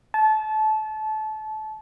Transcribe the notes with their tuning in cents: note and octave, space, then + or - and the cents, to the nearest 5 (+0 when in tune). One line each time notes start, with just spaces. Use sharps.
A5 -25